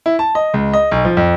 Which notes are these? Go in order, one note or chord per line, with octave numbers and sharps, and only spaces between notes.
E4
A5
D#5
C#2
D#5
B1
F3
F2